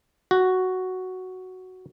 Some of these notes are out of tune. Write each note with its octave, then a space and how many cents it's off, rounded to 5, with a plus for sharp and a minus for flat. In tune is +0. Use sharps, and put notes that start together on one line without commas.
F#4 +5